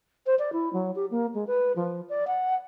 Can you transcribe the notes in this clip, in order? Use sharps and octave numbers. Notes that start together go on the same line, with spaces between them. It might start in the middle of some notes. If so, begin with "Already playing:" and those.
C5
D5
E4
F#3
G4
A#3
G#3
B4
F3
D5
F#5